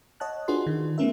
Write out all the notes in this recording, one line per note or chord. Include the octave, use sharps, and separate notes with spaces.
C#5 D#5 F#5 A5 F#6
D4 F4 F#4 G#4 B4 C6
D#3
A3 B3 C#4 A#4 E5